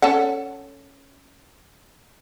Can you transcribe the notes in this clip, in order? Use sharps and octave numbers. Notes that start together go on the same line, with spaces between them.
C#4 A4 F#5